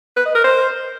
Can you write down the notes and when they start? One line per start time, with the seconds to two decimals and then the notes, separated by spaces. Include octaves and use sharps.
0.17 B4
0.26 D#5
0.35 A#4
0.44 C5